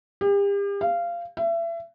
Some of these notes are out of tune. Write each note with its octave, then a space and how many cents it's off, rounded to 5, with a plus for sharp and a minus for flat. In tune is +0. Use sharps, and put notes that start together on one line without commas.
G4 +40
F5 -20
E5 +30